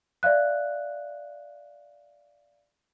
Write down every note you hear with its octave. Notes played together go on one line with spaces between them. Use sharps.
D5 E5 F5 F#6